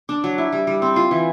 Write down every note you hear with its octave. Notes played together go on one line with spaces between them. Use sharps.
D4
F#3
E4
G3
G3
C4
F4
E3